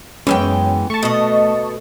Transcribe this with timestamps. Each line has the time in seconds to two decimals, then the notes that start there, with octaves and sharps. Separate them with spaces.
0.27 F#2 E3 G#3 B3 C#4 E5 G5
0.90 A3 A5 C#6
1.03 B2 D#5